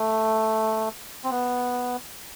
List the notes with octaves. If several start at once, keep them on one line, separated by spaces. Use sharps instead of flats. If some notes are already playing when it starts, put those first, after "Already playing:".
Already playing: A3
C4
B3